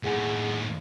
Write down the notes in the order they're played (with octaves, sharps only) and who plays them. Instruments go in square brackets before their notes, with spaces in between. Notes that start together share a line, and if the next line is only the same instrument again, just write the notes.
[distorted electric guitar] D#2 A2 [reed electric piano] G#4 F#5 G#5